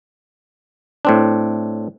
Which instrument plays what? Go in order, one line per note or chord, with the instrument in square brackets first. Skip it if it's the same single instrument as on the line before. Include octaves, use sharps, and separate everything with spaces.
[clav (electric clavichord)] A2 C4 D4